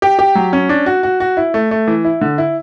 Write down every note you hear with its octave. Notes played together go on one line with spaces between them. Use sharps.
G4
G4
F#3
C#4
D4
F#4
F#4
F#4
E4
A3
A3
E3
E4
D3
E4